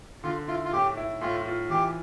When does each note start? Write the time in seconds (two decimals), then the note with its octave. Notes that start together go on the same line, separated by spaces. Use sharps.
0.24 D3 F4
0.48 E4 F4
0.65 F4
0.73 A2 G4
0.97 E4
1.21 A2 F4
1.46 F4
1.70 E3 G4